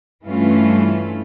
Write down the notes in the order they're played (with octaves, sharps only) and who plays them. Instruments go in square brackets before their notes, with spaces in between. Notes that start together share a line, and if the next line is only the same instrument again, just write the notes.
[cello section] G2 E3 A3 C#4 F4